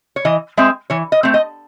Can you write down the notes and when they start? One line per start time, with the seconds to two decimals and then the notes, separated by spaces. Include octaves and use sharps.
0.16 C#5
0.25 E3 D#5
0.57 G#3 C4 E5
0.90 E3 C#5
1.12 D#5
1.23 A3 C4
1.34 D#5